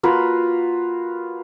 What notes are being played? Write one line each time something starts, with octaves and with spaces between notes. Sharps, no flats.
A#3 F4 F#4 B4